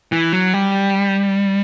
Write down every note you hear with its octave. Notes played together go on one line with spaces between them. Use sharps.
E3
F#3
G3